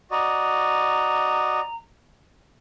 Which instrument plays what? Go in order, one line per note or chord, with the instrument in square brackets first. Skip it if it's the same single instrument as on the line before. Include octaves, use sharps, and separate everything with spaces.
[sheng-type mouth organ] F#4 D5 D#5 [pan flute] A#5